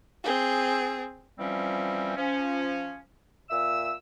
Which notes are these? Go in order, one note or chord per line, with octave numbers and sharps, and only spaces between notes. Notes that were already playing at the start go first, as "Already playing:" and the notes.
C4 G#4
E3 F3 G3 C4 C#4
F3 C#4
A#2 E5 E6